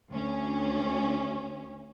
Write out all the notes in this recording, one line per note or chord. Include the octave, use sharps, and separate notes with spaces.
D2 C#4